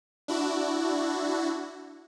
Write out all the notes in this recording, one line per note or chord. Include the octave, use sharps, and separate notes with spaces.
D4 E4 F#4